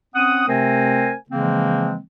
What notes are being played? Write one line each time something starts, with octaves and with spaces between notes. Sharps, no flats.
C4 C#4 F#5 D#6
C3 A3 C4 A#4 C5 G#5
C#3 E3 F3 G#3 A#3 C4